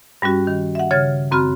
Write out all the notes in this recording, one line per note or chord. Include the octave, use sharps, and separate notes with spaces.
G2 G3 C#4 F#4
D#3
E5 F#5
C#3 C#5 F6 G#6 A6
F#2 C4 F#4 B5 F6